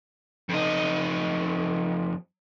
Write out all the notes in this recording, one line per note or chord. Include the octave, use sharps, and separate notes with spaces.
F2 D#4